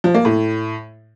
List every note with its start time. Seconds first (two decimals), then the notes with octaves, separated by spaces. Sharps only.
0.04 F3
0.14 A#3
0.25 A2